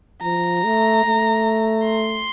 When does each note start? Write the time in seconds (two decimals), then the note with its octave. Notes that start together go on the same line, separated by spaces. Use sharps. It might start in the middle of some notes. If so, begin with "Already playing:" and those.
0.22 F3 A#5
0.64 A3
1.04 A3
1.85 C6